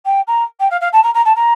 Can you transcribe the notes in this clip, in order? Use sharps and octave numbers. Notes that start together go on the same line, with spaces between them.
G5
A#5
G5
F5
F5
A5
A#5
A#5
A5
A#5